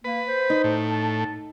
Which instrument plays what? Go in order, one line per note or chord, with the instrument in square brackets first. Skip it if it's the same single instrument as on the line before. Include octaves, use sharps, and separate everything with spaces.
[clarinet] A#3 [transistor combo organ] B4
[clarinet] C5
[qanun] D#4
[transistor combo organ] A2
[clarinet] A5